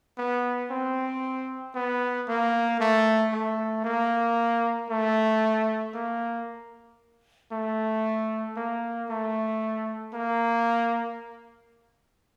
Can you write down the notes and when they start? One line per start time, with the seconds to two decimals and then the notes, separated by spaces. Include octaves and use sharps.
0.18 B3
0.71 C4
1.75 B3
2.28 A#3
2.80 A3
3.33 A3
3.85 A#3
4.90 A3
5.94 A#3
7.52 A3
8.57 A#3
9.10 A3
10.14 A#3